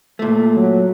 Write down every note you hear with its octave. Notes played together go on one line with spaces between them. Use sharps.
A#2 A3
F#3